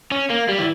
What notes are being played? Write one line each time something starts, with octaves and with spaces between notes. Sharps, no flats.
C#4
A#3
G3
E3